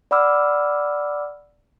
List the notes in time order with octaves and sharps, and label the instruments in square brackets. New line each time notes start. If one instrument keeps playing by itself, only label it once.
[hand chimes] D5 F#5 B5 D6 E6 F6